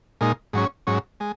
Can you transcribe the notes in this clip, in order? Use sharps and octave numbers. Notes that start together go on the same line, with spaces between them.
A#2 G#3 D#4
G#2 F#3 C#4
G#2 F#3 C#4
G#3